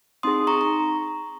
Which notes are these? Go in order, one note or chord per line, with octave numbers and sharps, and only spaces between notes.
C4 D#4 G#4 C6 D#6
A#5 C#6
A#5